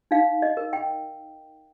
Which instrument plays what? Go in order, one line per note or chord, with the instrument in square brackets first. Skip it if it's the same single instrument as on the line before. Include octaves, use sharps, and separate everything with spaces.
[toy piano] D#4 F5
D#5
A#4
G5